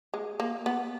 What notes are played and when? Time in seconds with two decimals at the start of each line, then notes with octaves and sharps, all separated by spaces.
0.14 G#3
0.40 A#3
0.66 B3